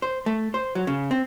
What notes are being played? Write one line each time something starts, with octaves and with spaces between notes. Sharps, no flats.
C5
A3
C5
F#3
C#3
C4